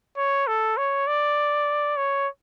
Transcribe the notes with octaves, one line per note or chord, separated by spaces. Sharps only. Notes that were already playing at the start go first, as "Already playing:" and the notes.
C#5
A4
C#5
D5
C#5